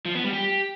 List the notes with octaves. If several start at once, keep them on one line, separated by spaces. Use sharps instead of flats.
F3
B3
G3
G4